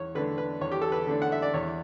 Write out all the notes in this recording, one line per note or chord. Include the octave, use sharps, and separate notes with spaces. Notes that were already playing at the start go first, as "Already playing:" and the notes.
Already playing: E2 C#5
D3 A3 D4 B4
B4
E2 C#5
G4
A4
B4
D3 A3 D4
F#5
E5
D5
E2 C#5